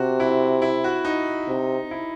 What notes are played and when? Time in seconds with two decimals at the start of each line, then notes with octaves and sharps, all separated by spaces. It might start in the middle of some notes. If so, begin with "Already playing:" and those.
Already playing: C3 F#4
0.20 E4
0.62 E4
0.84 F#4
1.05 D#4
1.48 C3
1.91 E4